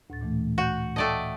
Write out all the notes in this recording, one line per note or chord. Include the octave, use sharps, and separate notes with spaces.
D2 A2 A6
A#2 E3 A3
F#4 F#6 G6
A3 D5 D#5 G5 A5